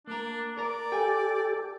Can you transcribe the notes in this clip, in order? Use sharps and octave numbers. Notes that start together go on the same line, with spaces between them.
A#3 D4 A#4
A#4 D5 A#5
G4 A4 G5 G#5